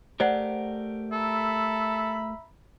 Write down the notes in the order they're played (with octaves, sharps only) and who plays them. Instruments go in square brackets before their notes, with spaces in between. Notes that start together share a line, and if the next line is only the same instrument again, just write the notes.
[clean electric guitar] A3 G4 A#4 [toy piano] C5 D5 F#5
[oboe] A4 [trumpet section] E5 A#5 B5